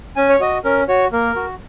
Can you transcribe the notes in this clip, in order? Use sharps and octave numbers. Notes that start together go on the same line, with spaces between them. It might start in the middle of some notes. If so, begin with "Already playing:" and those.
C#4 G#5
C#5
F#4 D#5
C#4 A#4
F#4 C#5
A#3 A#4
F#4